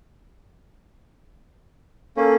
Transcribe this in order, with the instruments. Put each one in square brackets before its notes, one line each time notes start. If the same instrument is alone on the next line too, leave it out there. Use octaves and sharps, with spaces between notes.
[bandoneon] A#3 C#4 [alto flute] A4